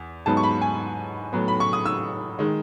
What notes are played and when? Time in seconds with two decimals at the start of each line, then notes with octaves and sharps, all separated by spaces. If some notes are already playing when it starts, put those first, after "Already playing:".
Already playing: E2
0.26 G#2 F#3 B3 A5
0.37 C#6
0.43 B5
0.62 G#5
1.33 A2 F#3 B3
1.48 B5
1.60 C#6
1.73 D#6
1.86 E6
2.39 D#3 G#3